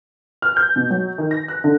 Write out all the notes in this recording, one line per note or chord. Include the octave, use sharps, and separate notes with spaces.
F6
G6
B2
F#3
D#3
A#6
F#6
D3